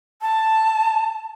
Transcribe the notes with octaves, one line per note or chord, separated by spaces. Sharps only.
A5